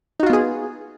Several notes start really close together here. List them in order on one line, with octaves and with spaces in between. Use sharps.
D#4 F#4 F4 B3 G#4